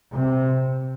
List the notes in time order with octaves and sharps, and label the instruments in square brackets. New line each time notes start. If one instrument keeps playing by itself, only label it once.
[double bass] C3